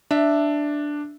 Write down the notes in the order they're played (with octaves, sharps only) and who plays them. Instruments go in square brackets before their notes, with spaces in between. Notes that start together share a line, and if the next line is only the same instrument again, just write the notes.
[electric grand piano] D4 [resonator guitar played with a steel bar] E5